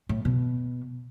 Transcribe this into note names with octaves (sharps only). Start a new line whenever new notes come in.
A2
B2